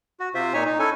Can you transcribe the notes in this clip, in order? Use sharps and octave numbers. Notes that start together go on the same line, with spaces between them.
F#4
C3 F4 C5 E5
A#2 D#4 C#5 G#5
D#4
C#4 E4 A4 G#5